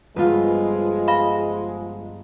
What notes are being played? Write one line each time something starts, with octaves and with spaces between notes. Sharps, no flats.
G1 F3 G#3 F4 B4
F5 B5